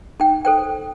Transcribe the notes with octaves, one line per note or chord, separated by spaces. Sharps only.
D#4 G5
A4 C5 G5